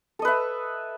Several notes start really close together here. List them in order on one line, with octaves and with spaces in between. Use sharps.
A4 D#5 B4 E5